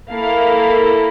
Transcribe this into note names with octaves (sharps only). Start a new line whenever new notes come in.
A#3 E4 A4 F5